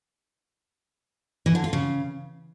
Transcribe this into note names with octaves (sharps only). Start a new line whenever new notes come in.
E3
D3
F4
C#3